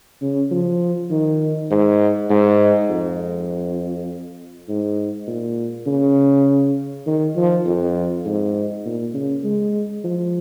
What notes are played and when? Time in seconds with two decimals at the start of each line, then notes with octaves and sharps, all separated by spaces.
0.22 C#3
0.51 F3
1.11 D#3
1.71 G#2
2.30 G#2
2.89 F2
4.69 G#2
5.28 A#2
5.87 C#3
7.07 D#3
7.36 F3
7.66 F2
8.26 G#2
8.85 A#2
9.14 C#3
9.44 G#3
10.04 F3